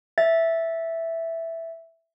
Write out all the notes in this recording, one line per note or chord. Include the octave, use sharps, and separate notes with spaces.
E5 A6